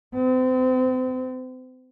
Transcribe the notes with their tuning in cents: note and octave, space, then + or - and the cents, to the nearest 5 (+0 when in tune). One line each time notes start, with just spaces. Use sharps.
C4 -35